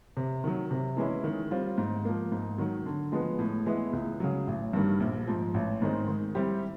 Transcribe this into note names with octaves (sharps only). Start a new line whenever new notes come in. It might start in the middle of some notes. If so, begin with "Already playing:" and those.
C3
D#3 F#3
C3
E3 G#3 C#4 E4
D#3
G3 C4 F4
G#2
F3 A#3
G#2
D#3 F#3
D3
F3 G#3 B3
A2
E3 G#3 B3 E4
C#2
C#3 F#3
A1
G2 D#3 G3
A#1
G#2 F3
A1
G#2 D#3 G#3 C4
D#3
G3 C4 E4 G4